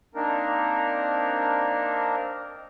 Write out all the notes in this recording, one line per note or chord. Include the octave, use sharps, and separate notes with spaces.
A#3 C4 D4 D#4 A#4